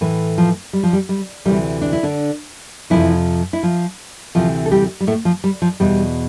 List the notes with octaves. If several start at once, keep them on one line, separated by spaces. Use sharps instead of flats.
A2 E3
F3
G3
F3
G3
G3
D2 C3 E3 G3
D4
E4
D3 D4
F2 C3 E3 F3 E4
E4
F3 F4
D2 C3 E3 F3 F4
A4
G3 G4
G3
A2 A3
F3
G3
F3
E2 B2 G3